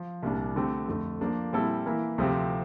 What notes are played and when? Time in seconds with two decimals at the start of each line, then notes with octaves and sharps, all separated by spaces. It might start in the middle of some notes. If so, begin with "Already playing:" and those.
Already playing: F3
0.23 C2 A#2 G3 D4
0.56 D3 A3 C4 G4
0.88 F2 D3 A3
1.21 F3 A#3 D4
1.53 A#2 G3 C4 E4 A4
1.86 E3 A#3 E4 A#4
2.18 D2 C3 F3 C4 G4